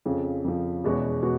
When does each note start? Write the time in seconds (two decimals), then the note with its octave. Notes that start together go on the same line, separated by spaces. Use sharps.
0.06 F2 C#3 F3
0.44 F2 C#3 F3
0.84 E2 B2 G#3 C#4 F#4
1.23 B2 G#3 F#4